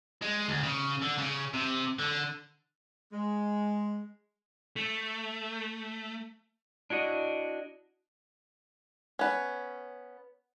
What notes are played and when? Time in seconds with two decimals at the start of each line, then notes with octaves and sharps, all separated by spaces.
0.22 G#3
0.49 D2
0.63 C#3
1.02 D3
1.18 C#3
1.53 C3
1.99 D3
3.13 G#3
4.76 A3
6.90 D4 E4 F#4 D#5
9.19 B3 C#4